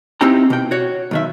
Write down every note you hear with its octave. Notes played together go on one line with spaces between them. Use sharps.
C4 D#4 E4 G4 G5 A#5
B2 G5
F#4 C#5
B1 D#3 E5